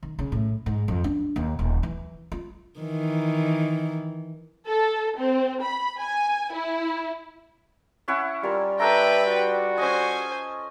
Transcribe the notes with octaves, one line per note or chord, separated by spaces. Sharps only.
D#3
C#3
A2
G#2
F2
D4
D#2
D#1
E3
F4
D#3 E3
A4
C4
B5
G#5
E4
C#4 E4 F#5
G3 F4 A#4
D4 A4 B4 E5 G5 A#5
F#4
C#4 C5 D#5 G#5